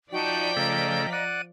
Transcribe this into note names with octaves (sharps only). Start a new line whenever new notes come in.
F3 D#4 F#4 D5 G5 A5 B6
C#3 A3 A4 D#5 F5 A#5
D5 F#5 D#7